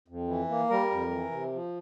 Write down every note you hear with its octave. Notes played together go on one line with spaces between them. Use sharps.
F2
E3
A#3
G3 A#4
F2
E3
C3
F3